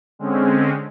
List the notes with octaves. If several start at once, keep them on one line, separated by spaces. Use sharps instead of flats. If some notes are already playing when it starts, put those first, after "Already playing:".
D3 G#3 C4 C#4